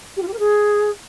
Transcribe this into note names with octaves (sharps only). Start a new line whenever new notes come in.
G4
F4
G4
A#4
G#4